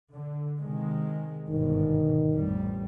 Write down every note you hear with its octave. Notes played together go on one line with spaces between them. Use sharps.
D3
C3 D#3 G#3
G1 G#2 B2 D#3
A1 F2 G3